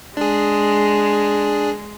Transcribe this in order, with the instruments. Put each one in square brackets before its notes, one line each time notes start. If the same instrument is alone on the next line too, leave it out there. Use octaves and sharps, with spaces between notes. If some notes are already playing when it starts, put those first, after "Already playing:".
[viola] G#3 [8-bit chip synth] D4 G#4